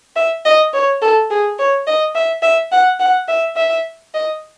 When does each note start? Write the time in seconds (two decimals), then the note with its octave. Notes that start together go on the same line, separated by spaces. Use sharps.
0.16 E5
0.45 D#5
0.73 C#5
1.02 A4
1.30 G#4
1.58 C#5
1.87 D#5
2.15 E5
2.42 E5
2.72 F#5
3.00 F#5
3.28 E5
3.56 E5
4.14 D#5